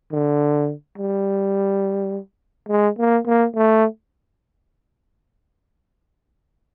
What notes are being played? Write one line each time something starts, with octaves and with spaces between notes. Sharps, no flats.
D3
G3
G#3
A#3
A#3
A3